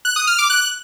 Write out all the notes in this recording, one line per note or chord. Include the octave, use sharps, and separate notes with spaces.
F#6
D#6
F6
D6
F#6